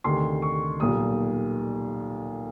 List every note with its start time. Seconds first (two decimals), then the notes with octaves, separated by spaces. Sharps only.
0.04 D2 C3 D#3 C6
0.42 C#6
0.80 B1 A#2 G3 D#6